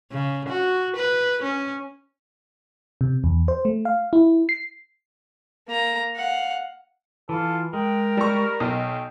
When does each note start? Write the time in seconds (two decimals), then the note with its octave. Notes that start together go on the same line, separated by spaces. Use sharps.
0.12 C#3
0.49 F#4
0.96 B4
1.43 C#4
3.01 C3
3.24 E2
3.48 C5
3.65 A3
3.85 F5
4.13 E4
4.49 C7
5.69 A#3 A#5
6.16 F5 F#5
7.29 E3 F4 A4
7.73 G#3 A#4 G5
8.17 G3 C#6
8.60 B1 D#5 G5 D#6